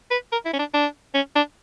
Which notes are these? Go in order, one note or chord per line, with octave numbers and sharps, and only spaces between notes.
B4
A#4
E4
C#4
D4
D4
C#4
D4